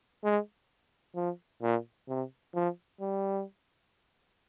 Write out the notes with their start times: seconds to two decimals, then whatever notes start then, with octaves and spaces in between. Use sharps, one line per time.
0.24 G#3
1.16 F3
1.62 A#2
2.08 C3
2.55 F3
3.01 G3